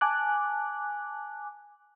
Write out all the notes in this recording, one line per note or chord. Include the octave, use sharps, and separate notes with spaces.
G#5 A5 D6 F#6